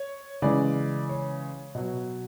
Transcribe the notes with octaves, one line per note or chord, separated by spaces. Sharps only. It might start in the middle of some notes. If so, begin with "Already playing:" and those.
Already playing: C#5
C#3 E3 G#3 D5
C#5
B2 F#3